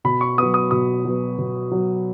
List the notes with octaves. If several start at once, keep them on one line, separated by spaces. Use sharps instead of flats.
B2 B5
C#6
F#3 B3 D#6
D#6
B2 D#6
F#3 B3
B2
F#3 B3